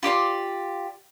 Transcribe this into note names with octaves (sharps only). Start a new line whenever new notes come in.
F4 G4 D5 C6